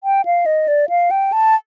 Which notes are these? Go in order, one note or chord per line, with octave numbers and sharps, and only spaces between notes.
G5
F5
D#5
D5
F5
G5
A5